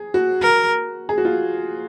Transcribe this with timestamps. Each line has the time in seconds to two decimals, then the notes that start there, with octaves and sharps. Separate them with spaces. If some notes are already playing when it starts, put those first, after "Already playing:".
Already playing: G#4
0.14 F#4
0.42 A#4
1.09 G#4
1.18 F#4
1.25 F4